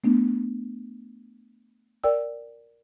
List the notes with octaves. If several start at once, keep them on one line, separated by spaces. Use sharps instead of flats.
A3 B3 D4
A#4 D5 G5 E6